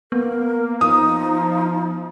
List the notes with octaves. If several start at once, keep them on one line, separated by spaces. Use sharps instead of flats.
A#3 B3 A#4
F3 D#4 D#6